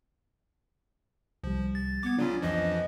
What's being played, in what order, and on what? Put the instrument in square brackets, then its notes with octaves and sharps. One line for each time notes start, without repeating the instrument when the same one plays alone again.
[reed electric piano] C2 G3 [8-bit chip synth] F3
[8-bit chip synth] A6
[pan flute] B3 [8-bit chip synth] D6 G#6
[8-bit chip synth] C#3 F#3 C#4 [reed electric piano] D4 [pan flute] F4
[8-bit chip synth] F2 E3 F3 [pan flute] D#5